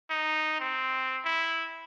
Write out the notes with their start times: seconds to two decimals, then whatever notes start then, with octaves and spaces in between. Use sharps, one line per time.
0.10 D#4
0.60 C4
1.24 E4